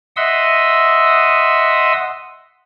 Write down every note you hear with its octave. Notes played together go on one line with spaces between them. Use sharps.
D#5 E5 F#5 C6 D#6 E6